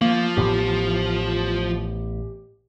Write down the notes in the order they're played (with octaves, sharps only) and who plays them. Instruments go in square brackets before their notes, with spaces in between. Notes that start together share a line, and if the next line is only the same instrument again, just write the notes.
[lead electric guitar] F3 [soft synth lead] A#3
[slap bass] A1 A2 B3 [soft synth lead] G4